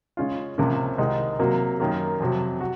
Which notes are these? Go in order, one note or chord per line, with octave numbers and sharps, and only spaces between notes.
C#3 G#3 C#4 F4
C#2 C3 F3 A#3 C#4
C2 C3 D#3 G#3 D#4
C3 F#3 A#3
F#2 D#3 A#3
F2 C3 F#3
F#4